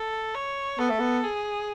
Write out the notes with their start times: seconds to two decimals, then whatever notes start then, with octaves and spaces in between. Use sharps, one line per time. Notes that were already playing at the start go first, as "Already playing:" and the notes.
Already playing: A4
0.35 C#5
0.79 B3 A4
0.90 A3
1.00 B3
1.23 G#4